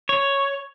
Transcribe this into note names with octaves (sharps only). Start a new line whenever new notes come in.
C#5